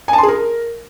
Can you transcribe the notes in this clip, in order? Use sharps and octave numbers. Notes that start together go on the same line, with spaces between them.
G#5
A5
C6
G#4
A#4